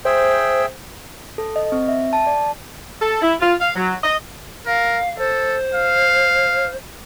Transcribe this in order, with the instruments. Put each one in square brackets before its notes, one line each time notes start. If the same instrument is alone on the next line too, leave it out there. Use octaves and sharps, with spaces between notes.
[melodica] G#4 E5 G5 [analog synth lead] C5
[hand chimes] A4
D#5
C4
E5
A5
D5
[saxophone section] A4
E4
F4
F5
F#3
D#5
[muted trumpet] A#4 [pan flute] F5
[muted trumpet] A4 [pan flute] C5
[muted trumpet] F5